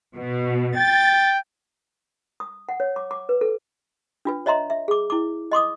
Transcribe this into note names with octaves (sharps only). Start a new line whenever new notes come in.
B2
G5 A6
D#6
F#5
C#5
D6
D6
B4
A4
D4 F4 B4
C#5 D#5 E5 A#5 C6
E5
G#4 D6
E4 D6
D#5 C6 D6 D#6